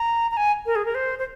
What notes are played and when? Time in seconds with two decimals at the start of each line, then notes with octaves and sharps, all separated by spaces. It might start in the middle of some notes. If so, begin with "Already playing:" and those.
Already playing: A#5
0.31 A#5
0.37 G#5
0.66 A#4
0.76 G#4
0.85 A#4
0.95 C5
1.19 C5